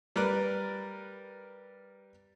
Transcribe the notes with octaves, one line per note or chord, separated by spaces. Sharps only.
G3 A#4 B4 D5 F#6